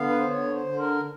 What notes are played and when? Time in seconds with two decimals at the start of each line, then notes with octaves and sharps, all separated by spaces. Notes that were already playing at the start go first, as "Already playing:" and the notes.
Already playing: D3 B3 F5
0.09 B4
0.19 C5
0.29 D3 C#5
0.54 C5
0.67 D3
0.79 A#4